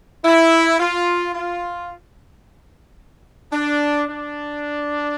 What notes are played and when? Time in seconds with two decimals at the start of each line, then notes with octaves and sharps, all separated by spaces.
0.25 E4
0.80 F4
1.35 F4
3.53 D4
4.07 D4